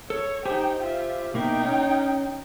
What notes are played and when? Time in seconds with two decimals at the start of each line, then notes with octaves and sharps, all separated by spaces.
0.10 A4 C#5
0.45 D#4 G4 C5 G5 G#5
0.79 F4 E5
1.34 B2 A#3 D#4 E4 G5
1.65 C#4